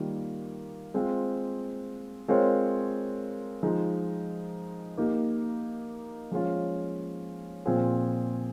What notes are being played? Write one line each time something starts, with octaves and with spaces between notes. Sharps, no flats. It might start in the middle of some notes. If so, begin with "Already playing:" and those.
Already playing: D#3 G3 A#3 F4
G#3 C4 F4 C5
G#3 C4 F4 A#4 C#5
F3 G#3 D#4
A#3 D#4 G4
F3 G#3 C#4 F4
A#2 F3 C4 F4 G#4